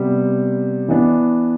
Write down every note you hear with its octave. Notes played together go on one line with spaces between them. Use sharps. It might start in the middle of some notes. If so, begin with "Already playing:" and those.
Already playing: C3 G3 B3
E3 B3 D4